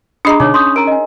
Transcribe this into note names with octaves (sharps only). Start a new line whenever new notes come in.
D4 G#4 D#5 A#5 B5 D#6
B2 D3 D#4 C#5 D6
C#4 C6 C#6 D#6 G6
A#4 A#5 D7
D#5 G#5